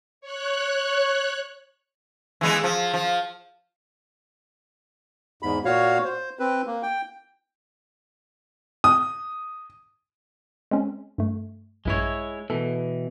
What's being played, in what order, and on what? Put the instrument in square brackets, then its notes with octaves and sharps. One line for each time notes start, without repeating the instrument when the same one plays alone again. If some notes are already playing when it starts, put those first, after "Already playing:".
[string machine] C#5 F#6
[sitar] E3 G#3 B3
F3
F3
[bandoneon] E2 G#2 B5
A#2 F#4 C#5 F5
C5
C4 B4
A#3
G5
[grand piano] D#6
[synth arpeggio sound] G#3 C4 C#4
G2 A3
[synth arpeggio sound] A#1 G2 B6 [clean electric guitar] G#3 E4 C#5
[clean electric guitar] B2 E3 [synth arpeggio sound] A4